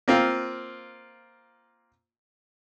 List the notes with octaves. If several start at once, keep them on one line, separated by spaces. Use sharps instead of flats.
A#3 C4 F4